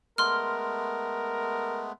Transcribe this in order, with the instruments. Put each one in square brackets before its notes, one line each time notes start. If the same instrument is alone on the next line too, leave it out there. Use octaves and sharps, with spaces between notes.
[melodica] G#3 A3 B3 [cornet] A#4 [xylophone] C6 F6